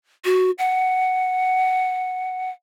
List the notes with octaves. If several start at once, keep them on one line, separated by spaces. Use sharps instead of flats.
F#4
F#5